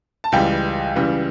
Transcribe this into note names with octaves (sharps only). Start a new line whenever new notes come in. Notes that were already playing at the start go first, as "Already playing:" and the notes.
A5
C#2 C#3 E3 G3 G5
C#2 C#3 E3 G3